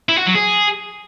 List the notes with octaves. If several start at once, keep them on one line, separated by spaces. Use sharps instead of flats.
E4
F#4
F#3
G#4